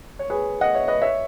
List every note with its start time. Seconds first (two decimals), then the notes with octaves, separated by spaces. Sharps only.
0.19 C#5
0.30 G#4 B4
0.61 D#5 F#5
0.74 C#5 E5
0.88 B4 D#5
1.02 C#5 E5